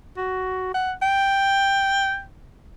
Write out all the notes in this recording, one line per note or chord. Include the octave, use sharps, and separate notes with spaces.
F#4
F#5
G5